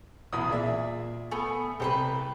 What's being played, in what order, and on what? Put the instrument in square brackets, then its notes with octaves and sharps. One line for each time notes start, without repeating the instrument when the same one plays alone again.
[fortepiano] B1 E2 B5 [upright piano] D#6
[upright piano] A#2 [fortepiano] G#4 D5 E5
[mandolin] A3 B3 [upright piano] G#5
[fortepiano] C2 C5 [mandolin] G4 A4 B4